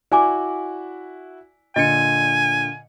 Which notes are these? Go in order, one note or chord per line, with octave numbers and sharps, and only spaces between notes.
E4 F#4 D5 G#5 D6
A#2 D3 D#5 G#5 C#7